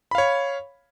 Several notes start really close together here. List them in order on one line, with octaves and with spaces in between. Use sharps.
B5 F5 C#5